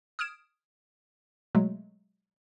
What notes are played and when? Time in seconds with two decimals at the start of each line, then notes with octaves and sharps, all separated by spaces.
0.19 D#6 F6 G#6 D7 E7
1.55 B2 F#3 G#3 A3